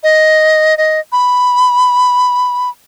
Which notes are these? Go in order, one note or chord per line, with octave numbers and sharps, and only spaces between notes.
D#5
D#5
B5